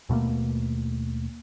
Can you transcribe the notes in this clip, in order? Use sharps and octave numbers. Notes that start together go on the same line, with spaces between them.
D#2 B2 A3 A#3